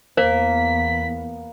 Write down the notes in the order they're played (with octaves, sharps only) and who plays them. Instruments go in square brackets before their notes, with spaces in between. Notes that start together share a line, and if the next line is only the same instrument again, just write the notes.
[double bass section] E2 B3 [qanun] A#3 [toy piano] C5 [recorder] B6